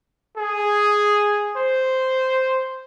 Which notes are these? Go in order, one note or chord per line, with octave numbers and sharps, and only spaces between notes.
G#4
C5